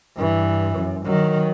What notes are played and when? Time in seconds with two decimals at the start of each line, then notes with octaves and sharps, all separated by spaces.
0.16 G2 E3
0.76 F#2
1.05 D#3 F#3